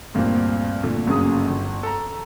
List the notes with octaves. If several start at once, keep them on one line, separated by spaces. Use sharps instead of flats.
D2 G2 A#2 A#3 C4
A#2 D3 A3
G1 F#2 C#3 A#3 G#4 D#6
G1
A4 A#5